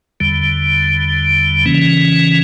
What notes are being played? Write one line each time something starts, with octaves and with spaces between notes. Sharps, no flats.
E2 D3 G3
C#3 E3 A#3 C#4